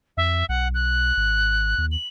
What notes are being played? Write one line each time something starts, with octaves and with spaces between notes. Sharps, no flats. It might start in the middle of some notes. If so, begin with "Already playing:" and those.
F2 E5
B1 F#5
F#6
G#1
D#2
F#7